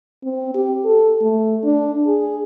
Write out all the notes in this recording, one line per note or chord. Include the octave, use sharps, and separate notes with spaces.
C4
G4
A4
A3
D4
G#4